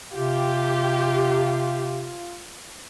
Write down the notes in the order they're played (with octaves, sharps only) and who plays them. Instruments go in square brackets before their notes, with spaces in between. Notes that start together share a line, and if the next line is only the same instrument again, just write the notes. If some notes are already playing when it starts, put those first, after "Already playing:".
[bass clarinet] C3 [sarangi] F4 [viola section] G4